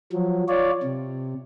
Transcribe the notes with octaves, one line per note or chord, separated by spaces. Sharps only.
F3 F#3
F4 C#5 D5
C3